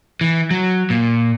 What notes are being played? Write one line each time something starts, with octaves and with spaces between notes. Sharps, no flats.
E3
F#3
A#2